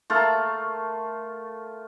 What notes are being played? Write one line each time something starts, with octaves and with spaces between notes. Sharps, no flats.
A3 F4 A#4